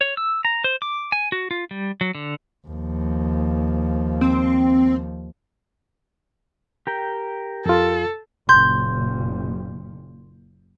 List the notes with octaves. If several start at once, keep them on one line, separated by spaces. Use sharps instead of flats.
C#5
E6
A#5
C5
D6
G#5
F#4
F4
G3
F#3
D3
D#2 F3
C4
G4 A#4 G5
F2 F4 A4
F#1 A#2 C6 G6